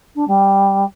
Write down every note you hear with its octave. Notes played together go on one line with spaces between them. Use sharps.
D4
G3